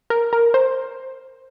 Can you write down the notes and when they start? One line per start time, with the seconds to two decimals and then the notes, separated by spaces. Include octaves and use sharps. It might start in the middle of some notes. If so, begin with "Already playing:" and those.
0.10 A#4
0.33 A#4
0.54 C5